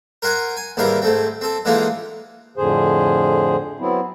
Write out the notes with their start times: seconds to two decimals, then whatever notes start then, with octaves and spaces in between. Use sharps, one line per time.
0.22 A#4 C5 F#5 G#5
0.57 G#5
0.77 D#2 G#2 E3 G3 A#4 F5
1.02 G#2 A3 C4
1.41 C4 A4
1.65 D3 E3 G#3 A#3 D#4 F4
2.57 F2 A2 D3 G#4 C5
3.80 F#3 B3 C4 E4